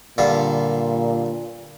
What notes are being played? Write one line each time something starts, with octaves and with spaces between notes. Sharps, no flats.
G2 A#2 D3 F4